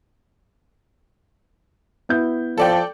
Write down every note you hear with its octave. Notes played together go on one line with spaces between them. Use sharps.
B3 E4 G6
F3 A4 D5 G5